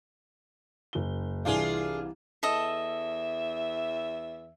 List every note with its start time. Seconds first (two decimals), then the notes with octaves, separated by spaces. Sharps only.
0.93 F#1 G7
1.45 C2 E3 D4 F4 G#4 F5
2.43 E2 A4 D#5 E5